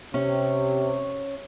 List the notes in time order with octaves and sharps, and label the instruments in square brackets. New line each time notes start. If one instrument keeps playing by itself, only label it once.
[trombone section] C3 [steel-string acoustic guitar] C#4 C#5